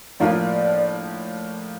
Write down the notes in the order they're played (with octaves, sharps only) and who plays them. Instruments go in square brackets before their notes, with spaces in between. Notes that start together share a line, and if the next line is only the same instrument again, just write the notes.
[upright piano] A2 F3 A#3 D4 F4 [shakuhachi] D5
[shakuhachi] D5